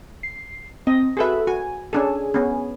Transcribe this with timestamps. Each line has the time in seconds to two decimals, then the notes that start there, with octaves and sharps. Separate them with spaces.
0.23 C7
0.87 C4 D#5
1.17 F#4 G#4 A4 B4 E5
1.47 F#4 G#5
1.93 C#4 D4 G#4 A4 G#5
2.34 B3 C#4